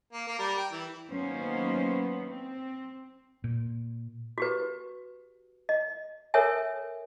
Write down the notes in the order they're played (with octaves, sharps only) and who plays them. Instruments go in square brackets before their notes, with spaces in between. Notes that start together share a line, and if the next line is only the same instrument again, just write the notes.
[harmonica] A#3
A#3
G3 A#4
G5
E3
[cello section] D#3 F#3 A#3 B3 C#4 C5
C4
[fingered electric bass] A#2
[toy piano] F#4 G4 B4
D#5
A4 A#4 C#5 E5 G#5